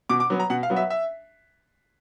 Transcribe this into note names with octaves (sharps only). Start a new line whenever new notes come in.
B2 D6
D6
F#3 B3
A#5
B2 F#5
F5
F#3 B3
E5
E5